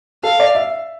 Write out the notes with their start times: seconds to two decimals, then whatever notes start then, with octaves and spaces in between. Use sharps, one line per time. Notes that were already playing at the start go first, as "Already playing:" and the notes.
0.23 A4 F5
0.40 D5
0.55 E5